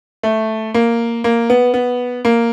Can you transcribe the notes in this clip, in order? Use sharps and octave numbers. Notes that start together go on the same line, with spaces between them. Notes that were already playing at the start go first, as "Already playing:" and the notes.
A3
A#3
A#3
B3
B3
A#3